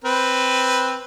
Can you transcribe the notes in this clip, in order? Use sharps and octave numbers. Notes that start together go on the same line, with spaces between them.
C4 B4